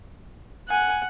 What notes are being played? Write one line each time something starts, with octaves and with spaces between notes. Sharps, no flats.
F#5 G#5